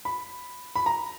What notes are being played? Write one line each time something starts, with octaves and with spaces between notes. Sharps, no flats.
B5
B5
A#5